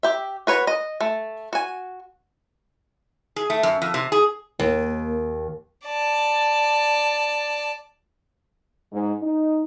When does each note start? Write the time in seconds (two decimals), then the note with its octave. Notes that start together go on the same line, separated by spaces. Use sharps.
0.03 G4 E5
0.47 F#4 B4 C#5
0.67 D#5
1.01 A3
1.53 F#4 G#5
3.36 G#4
3.50 A3
3.63 F#2
3.82 F2
3.94 C3
4.12 G#4
4.59 D#2 A#3
5.86 D5 A5
8.93 G#2
9.22 D#4